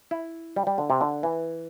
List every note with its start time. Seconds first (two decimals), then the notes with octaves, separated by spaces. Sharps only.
0.11 E4
0.56 G3
0.67 G3
0.78 D3
0.90 C3
1.01 D3
1.23 E3